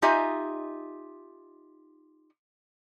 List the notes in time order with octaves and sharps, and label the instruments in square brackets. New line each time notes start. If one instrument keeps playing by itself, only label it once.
[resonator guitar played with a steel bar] D#4 F4 G4 D#5 E5 G#5